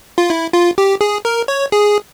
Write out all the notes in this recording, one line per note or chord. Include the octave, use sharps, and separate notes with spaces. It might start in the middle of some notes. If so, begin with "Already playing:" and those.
F4
E4
F4
G4
G#4
A#4
C#5
G#4